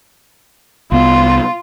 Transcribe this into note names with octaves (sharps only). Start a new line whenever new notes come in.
C2 B3 F4